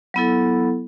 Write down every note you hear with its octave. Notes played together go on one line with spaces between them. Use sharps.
F#3 B3 E4 A4